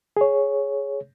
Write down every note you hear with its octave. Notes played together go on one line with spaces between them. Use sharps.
G#4 C#5